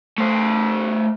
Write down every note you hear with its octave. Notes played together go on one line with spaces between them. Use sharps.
A3 C5